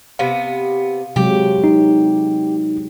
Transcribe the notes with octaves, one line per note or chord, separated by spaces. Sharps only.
C3 B3 F5
C3 F#3 G#3 G4
D#4